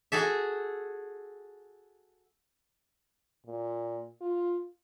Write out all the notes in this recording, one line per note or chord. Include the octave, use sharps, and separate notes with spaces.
F#4 G#4 A4 E5
A#2
F4